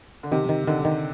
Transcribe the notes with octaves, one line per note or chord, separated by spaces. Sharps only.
D3
C3 D#3
D#3
D3 D#3
D#3